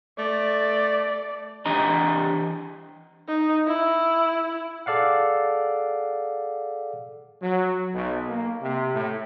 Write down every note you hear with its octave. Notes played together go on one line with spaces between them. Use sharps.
A3 D5
E3 D4 G4 D#5 A#5
D#4
E4
G#4 A4 D5 F5 F#5
F#3
B1
A#3
C3
A2